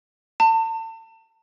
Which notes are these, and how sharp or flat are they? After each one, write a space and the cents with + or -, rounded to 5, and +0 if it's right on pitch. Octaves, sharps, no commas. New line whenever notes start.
A5 +40